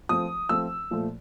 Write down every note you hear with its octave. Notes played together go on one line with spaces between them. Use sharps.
F3 A3 C4 D#6
F3 A3 C4 E6
A#2 F3 A3